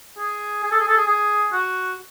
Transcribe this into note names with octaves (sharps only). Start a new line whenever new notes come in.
G#4
G#4
A4
G#4
A4
G#4
G#4
F#4